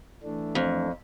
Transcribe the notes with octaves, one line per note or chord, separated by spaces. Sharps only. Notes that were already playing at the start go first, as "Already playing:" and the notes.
E3 A3 D4
F2